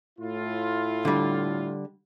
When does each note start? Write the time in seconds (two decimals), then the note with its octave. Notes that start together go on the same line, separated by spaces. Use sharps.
0.19 A2 E4 F4
1.05 D3 G3